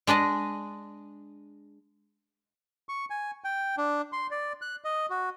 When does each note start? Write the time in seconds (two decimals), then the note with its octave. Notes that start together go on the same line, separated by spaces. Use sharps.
0.07 G#3 D4 D5 D#5
2.89 C#6
3.10 G#5
3.44 G5
3.78 D4
4.12 C6
4.31 D5
4.62 F#6
4.84 D#5
5.10 F#4